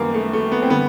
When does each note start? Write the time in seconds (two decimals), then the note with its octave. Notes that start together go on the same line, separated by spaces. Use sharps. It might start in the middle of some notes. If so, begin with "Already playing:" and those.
Already playing: F#2 D#3 G3 A#3 B3
0.14 A3
0.33 A3
0.52 B3
0.62 C4
0.70 D3 G3 B3